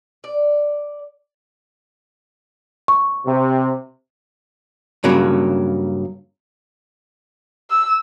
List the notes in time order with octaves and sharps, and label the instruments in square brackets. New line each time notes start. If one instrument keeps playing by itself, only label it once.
[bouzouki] D5
[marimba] C#6
[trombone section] C3
[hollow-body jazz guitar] G2 C#3 F#3 A#3
[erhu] E6